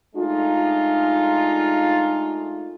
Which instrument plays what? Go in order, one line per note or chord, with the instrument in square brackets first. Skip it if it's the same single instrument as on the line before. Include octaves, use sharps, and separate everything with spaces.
[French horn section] G#3 A3 D4 D#4 F4